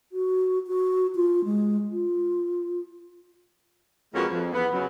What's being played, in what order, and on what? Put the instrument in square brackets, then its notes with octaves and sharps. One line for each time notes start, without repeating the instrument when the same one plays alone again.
[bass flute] F#4
F#4
F4
G#3
F4
[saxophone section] F2 G#3 A#3 B3 C#4 F#4
F2
E2 B3
F#2 C#3 F#3